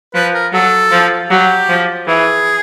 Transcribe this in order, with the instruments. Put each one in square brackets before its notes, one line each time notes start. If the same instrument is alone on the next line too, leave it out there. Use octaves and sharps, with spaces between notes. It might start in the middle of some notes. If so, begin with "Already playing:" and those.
[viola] F3 [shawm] B4
[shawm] A#4
[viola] F#3 [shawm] A4
[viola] F3
[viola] F#3 [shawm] G4
[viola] F3
[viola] E3 [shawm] G#4